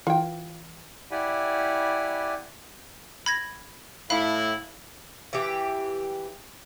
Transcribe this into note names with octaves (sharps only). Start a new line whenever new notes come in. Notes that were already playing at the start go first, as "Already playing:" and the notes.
E3 F4 G5
E4 G4 D5 F#5 G#5 B5
B5 G#6 A#6
A2 E4 F5 B5
E3 G4